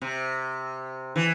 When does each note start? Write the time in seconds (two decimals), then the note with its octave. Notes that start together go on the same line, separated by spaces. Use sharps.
0.02 C3
1.16 E3